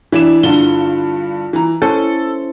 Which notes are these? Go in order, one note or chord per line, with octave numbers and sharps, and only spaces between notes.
E3 D4 E4 E7
G2 D3 F4 G7
E3 A#5
C#4 E4 A4 C5